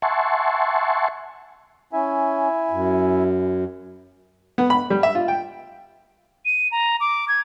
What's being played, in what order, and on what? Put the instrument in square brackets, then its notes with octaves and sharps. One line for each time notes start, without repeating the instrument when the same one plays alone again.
[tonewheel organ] E5 F#5 G#5 A5 C6 C#6
[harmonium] C#4 [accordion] E4 E5 G#5
[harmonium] F#2
[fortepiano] B3
B5
G3
E5
F4
G5
[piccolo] D#7
A#5
D6
G#6